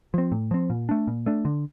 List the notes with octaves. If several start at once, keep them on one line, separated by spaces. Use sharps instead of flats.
F3 C4
A2
F3 C4
A#2
A3 D4
A#2
A3 D4
D3